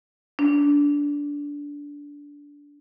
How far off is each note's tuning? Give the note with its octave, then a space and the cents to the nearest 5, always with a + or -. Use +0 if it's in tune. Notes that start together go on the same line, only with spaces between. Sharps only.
D4 -20